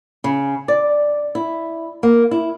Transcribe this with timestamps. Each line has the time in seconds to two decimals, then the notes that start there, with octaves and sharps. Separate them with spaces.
0.24 C#3
0.68 D5
1.35 E4
2.03 A#3
2.31 E4